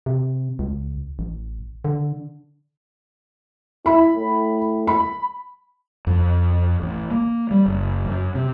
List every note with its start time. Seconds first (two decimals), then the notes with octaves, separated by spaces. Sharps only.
0.06 C3
0.59 C#2
1.19 A1
1.85 D3
3.86 E4 B5
4.15 A2
4.87 B5
6.07 F2
6.82 A1
7.11 A#3
7.51 G3
7.66 F#1
8.06 F#2
8.35 C3